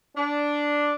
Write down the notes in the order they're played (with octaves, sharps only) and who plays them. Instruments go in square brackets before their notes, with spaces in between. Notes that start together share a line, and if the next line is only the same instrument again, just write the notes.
[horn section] D4